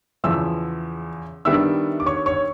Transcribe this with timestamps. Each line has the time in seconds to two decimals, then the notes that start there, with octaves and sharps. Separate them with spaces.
0.24 E2 C#3 F3 E5 E6
1.45 D#3 G3 B3 D4 E5 E6
2.00 D6
2.06 C#5 C#6
2.26 C#5 C#6